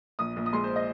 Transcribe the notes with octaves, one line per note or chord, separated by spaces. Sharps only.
A#1 D#6
A#1
D#6
G#3 C6
C5
D#5